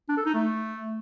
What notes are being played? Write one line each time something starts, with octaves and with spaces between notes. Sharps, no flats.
D4
A4
D#4
A3